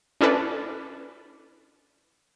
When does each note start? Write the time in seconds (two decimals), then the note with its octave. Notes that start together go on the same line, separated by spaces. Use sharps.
0.21 C#4 D4 E4 A4 B4 D5